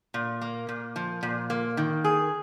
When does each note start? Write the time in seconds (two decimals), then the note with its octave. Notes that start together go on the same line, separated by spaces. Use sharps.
0.14 A#2
0.41 A#3
0.69 A#2
0.96 F3
1.23 A#2
1.50 A#3
1.77 D#3
2.04 G#4